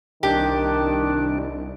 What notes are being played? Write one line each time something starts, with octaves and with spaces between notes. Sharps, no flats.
C2 D#3 D4 G4